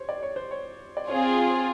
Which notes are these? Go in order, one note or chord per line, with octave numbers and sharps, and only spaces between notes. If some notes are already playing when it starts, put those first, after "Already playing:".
Already playing: C5 C#5
D5
C#5
C5
C#5
D5
C4 F4 G#4 C#5